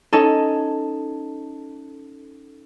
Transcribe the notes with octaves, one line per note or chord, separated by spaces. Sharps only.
C#4 D#4 A4